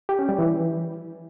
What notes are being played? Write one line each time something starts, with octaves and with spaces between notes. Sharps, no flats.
G4
C#4
G3
E3